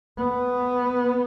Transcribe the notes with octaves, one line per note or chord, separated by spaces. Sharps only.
B3